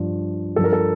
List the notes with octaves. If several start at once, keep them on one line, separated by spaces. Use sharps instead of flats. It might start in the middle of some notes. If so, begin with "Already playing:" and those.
Already playing: G2 F3
G2 F3 A4
A#4
A4